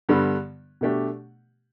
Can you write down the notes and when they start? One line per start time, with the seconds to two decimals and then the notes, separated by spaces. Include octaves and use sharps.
0.09 G2 D3 G3 B3
0.81 B2 A3 D4 G4